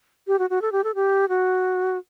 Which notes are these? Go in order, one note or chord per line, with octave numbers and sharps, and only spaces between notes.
G4
F#4
F#4
A4
G4
A4
G4
F#4